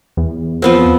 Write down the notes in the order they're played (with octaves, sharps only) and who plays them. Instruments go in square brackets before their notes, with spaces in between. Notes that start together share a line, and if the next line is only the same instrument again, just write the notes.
[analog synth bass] E2
[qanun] F3 B3 C4